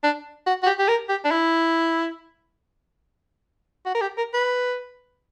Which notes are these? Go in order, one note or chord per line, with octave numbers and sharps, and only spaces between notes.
D4
F#4
F#4
G4
G4
A#4
G4
D4
E4
F#4
A#4
G4
A#4
B4